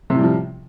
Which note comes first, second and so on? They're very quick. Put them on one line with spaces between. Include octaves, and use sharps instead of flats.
C3 A2 G3 F3